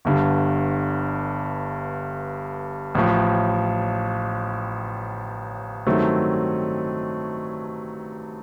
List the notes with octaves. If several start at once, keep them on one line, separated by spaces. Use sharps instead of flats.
G1 G2 D3
A1 A2 F3
G2 D#3 F#3 A3 C4